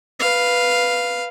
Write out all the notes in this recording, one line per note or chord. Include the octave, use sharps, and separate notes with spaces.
B4 F5